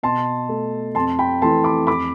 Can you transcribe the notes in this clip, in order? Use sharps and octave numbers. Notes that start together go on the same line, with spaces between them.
B2 A5 C6
A3
F2 A5 C6
G5 B5
E3 A3 A5 C6
B5 D6
F2 B5 D6